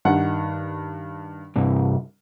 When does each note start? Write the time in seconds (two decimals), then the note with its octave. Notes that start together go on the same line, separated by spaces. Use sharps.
0.05 G2 D#3 F#5
1.56 C2 G2